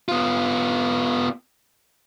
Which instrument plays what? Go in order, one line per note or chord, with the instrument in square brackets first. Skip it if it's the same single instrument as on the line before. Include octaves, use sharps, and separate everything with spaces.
[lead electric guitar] B3 F4